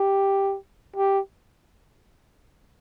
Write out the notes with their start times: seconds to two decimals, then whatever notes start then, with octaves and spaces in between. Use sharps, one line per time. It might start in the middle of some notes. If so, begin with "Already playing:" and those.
Already playing: G4
0.96 G4